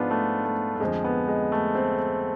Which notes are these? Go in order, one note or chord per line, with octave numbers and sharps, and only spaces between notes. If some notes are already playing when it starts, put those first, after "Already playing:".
Already playing: G#2 F3 B3 D4 F4 G#4
A3
A3
A3
F2 D3 F3 G#3
B3
G#3
A3
C4